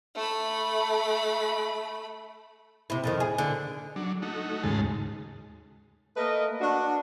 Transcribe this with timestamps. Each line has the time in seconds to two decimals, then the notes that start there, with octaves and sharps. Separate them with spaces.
0.16 A3 B5
2.90 C3 E4
3.04 F2 A2 D#3
3.20 G#4
3.38 D3
3.96 F#3 D4
4.22 A3 D#4 F#4
4.63 D#2 G#2 C#3 G#3 A5
6.17 A3 A#3 A#4 B4 D#5
6.61 D4 F#4